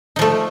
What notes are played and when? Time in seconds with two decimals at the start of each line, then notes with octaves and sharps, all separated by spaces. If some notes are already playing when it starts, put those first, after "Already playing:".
0.16 D#4
0.19 F3
0.21 A3